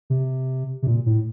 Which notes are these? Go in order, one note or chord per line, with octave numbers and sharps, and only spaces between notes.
C3
C3
A#2
A2